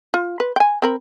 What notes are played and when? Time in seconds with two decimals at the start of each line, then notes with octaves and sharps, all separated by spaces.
0.14 F4
0.40 B4
0.56 G5 G#5
0.82 C4 A#4 B5